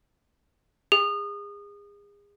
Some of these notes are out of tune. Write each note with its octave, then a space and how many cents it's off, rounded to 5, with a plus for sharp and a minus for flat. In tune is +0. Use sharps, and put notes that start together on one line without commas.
G#4 -30